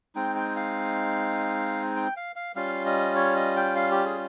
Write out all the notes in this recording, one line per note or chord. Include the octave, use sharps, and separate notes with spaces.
G#3 C4 D#4 G5
G5
F5
G5
F5
F5
G3 C#4 F4 F5
D#5
C#5
D#5
G5
F5
G4
G#4